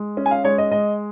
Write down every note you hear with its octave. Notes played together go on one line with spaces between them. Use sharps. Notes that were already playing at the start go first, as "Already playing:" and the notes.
Already playing: G#3
C#4
G#5
F5
G#3 C#5
D#5
G#3 D#5